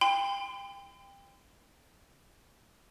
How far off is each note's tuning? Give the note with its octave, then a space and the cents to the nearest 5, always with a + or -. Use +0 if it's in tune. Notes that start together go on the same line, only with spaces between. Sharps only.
G5 +25 C6 -45